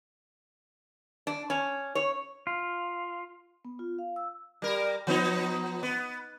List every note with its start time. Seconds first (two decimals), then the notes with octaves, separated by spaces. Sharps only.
1.27 D4
1.50 C#4
1.95 C#5
2.47 F4
3.65 B3
3.79 F4
3.99 F5
4.16 E6
4.62 G3 A#4
5.07 F3 B3 D#4
5.83 B3